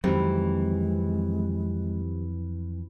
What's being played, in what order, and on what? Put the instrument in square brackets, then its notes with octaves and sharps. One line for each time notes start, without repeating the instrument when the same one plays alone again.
[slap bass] F2 F#3 [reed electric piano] D#3 C4 G4 [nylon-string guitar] E3 [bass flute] G#3